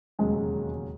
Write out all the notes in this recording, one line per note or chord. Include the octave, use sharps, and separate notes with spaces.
E1 D#2 C#3 F#3 G#3 C#4